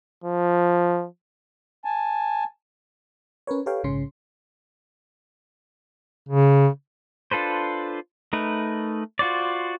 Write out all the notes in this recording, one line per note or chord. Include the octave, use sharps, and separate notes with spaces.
F3
G#5 A5
C#4 A#4 B4 C#5
G4 A4 B4 C#5 F5 G5
A#1 G#2 C#3 C#4 C6
C#3
D4 F4 A4 B4 C5
A3 D#4 A#4 B4
F4 F#4 C5 D5